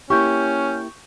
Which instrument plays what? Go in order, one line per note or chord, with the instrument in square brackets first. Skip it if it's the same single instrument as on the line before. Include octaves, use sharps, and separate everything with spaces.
[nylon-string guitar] A#3 E4 G4 [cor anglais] C#4 [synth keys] C#6 G6